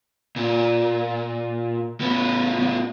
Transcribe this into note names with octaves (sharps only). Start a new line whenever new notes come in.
A#2
A2 B3